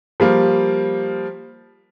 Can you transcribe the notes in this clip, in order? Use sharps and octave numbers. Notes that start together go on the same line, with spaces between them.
F3 G3 A#3